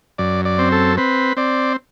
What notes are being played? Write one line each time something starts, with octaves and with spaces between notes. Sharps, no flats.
F#2 D5
D5
C4
A4
C4 B4
C4 D5